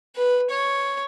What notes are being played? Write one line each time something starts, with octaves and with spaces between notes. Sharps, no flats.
B4
C#5